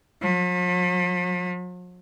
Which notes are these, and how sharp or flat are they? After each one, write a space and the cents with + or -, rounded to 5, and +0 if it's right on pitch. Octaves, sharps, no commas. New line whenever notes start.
F3 +45